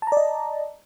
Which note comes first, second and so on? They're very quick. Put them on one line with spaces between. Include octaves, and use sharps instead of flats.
A5 A#5 D5 D#5